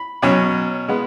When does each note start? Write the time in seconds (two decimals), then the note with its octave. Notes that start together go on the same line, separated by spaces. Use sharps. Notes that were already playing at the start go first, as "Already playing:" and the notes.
Already playing: B5
0.22 B2 F#3 C#4
0.88 G#3 B3